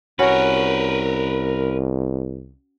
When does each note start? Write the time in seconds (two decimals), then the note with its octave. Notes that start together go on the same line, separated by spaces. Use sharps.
0.19 C2 C#4 F#4 A#4 B4